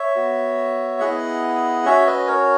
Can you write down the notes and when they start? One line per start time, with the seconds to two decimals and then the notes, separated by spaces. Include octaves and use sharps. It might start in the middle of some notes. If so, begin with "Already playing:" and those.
Already playing: C#5 E5
0.16 B3 F#4
1.00 B3 E4 G#4 D#5 F#5
1.85 C#4 F#4 C#5 E5
2.07 B4 D#5
2.27 A#4 C#5